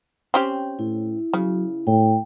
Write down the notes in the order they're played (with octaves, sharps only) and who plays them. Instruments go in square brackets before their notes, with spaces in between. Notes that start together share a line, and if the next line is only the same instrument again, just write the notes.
[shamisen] C4 C#4 G4
[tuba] A2 [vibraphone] E4
[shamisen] C#3 [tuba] F#3
[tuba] A2 [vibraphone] G5